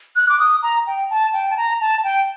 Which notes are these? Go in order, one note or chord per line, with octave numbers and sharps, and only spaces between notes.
F#6
D6
D#6
A#5
G5
A5
G5
A5
A#5
A5
G5